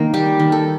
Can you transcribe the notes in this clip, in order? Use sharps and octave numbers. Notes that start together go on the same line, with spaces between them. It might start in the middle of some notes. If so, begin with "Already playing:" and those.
Already playing: D#3 A#3 D#4
G3 G4
D#3
A4